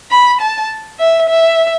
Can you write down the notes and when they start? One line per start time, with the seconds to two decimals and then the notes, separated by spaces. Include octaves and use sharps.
0.11 B5
0.41 A5
0.99 E5
1.29 E5